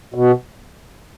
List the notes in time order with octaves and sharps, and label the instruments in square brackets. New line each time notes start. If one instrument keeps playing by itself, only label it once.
[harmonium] B2